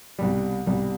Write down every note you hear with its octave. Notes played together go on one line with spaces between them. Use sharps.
C2 B2 G3
C2 B2 G3